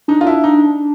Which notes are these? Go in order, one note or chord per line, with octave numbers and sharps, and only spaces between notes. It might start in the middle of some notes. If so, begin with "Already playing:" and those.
D4 D#4
F4
E4
D#4